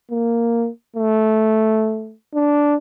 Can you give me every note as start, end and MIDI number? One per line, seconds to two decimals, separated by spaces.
0.11 0.69 58
0.96 2.14 57
2.35 2.75 62